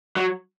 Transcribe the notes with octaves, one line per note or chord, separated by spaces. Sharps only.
F#3